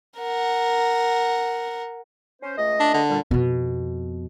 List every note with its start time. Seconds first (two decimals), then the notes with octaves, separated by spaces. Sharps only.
0.18 A#4 F#5
2.41 C#4 C5
2.57 C#2 A3 D#5
2.80 D4
2.94 D3
3.09 A#2 G3
3.31 F2 B2